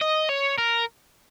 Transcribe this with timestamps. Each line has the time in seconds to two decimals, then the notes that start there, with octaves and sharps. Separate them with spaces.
0.02 D#5
0.29 C#5
0.58 A#4